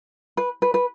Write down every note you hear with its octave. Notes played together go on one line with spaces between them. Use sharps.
B4
B4
B4